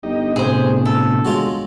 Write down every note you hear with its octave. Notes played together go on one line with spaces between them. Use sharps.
G1 D#4 G4 D#5
A2 C3 G#4 C5
A4
F#3 G#3 F4